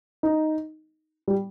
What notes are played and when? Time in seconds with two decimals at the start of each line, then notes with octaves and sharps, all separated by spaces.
0.23 D#4
1.28 G3